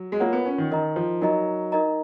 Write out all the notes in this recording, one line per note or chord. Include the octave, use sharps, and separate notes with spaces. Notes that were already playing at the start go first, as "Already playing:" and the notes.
Already playing: F#3
G#3
A#3 F4 A#4 C#5 F#5
B3
C#4
D#3
D#3 D#4 A#4 D#5 A#5
F3
F#3 D#4 A#4 D#5 A#5
D#4 A#4 D#5 A#5